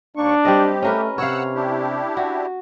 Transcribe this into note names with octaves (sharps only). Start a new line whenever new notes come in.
D#2 A#3 D4 C#6
G3 C4 G4 D#5
A3 C#4 A#4 B4
C3 C#5 F5 F#5 E6 F#6
D4 E4 G4
F#4